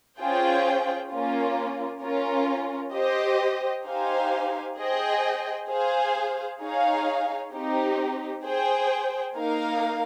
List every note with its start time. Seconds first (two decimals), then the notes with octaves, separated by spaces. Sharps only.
0.19 C#4 F4 G#4 C5 G5
1.10 A#3 C#4 F4
2.02 C#4 F4 A#4
2.93 G4 C5 D#5
3.85 D#4 G4 C5 F5 G#5
4.77 G#4 C5 D#5 G5
5.69 G#4 C5 F5
6.60 D#4 G#4 C#5 F5
7.52 C4 D#4 G4
8.44 G#4 C5 G5
9.36 A#3 D#4 A#4 F5